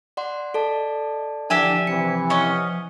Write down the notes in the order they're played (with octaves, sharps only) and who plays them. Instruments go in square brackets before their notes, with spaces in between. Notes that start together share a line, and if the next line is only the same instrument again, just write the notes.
[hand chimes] D5 F#5 C6
[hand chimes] A4 D5 A5 [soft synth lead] D#5
[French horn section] D3 E3 D4 [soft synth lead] F3 [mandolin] G4 E5 G#5
[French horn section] C3 E3 [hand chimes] C#7
[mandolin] C#4 D#5 F#5